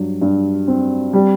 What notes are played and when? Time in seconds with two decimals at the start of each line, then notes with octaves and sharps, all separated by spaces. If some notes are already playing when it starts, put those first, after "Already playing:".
Already playing: G2 F#3
0.22 G2
0.68 C4
1.13 G3